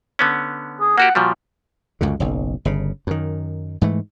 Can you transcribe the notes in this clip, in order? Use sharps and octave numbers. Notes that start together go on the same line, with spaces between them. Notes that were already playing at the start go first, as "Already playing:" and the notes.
D3 B3 C#4
G#4
A#3 F#4 G4 F#5
A#2 F3 G3 F#4
C#2 F#2 D3
F#1 B1
G1 C#3
F#2 D#3
G#2 E3 A3